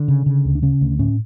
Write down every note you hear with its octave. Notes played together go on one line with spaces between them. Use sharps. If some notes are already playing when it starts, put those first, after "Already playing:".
Already playing: D3
C#3
C#3
D2
D4
C#3 C#4
D2
A2 C#4